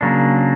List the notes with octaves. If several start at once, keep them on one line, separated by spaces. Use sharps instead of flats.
C#3 F#3 A#3 D4